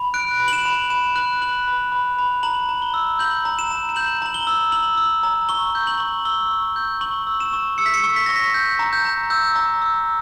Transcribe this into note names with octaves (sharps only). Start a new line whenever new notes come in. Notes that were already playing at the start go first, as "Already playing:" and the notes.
Already playing: B5
F#6 D7
B5
F#7
E7
B5
B5 E7
F#6 F#7
F#6 F#7
B5
B5
B5
A#5 F#7
A#5
G7
E6
G6 F#7
A#5
E7
A#5
E7
G6 F#7
A#5 F#7
G7
E6
E6 F#7
E6
A#5
C#6 G7
G6
F#7
C#6
E6 G7
C#6
G6
C#6 F#7
E6
E7
C#6
E6 C#7
B6
C#7
C#6
B6
C#6 A#6
B6
G6
A#5
G6
A#5
E6 G6
A#5
E6